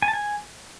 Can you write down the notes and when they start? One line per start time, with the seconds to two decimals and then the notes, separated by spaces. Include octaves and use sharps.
0.02 G#5
0.08 A5
0.13 G#5